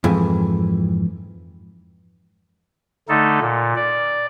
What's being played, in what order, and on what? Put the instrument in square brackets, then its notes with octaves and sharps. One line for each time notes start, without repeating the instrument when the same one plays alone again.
[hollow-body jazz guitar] F2 G#2 E3
[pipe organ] D3 A3 D#4 A4
A#2
D5